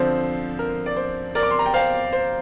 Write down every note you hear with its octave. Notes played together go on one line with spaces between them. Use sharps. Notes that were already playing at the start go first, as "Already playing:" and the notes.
Already playing: D3 F3 C4 C5
A#4
D5
C5
A#4 D5
D6
C6
A#5
G5
C5 F5
C5